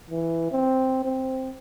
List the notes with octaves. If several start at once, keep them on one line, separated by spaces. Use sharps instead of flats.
E3
C4
C4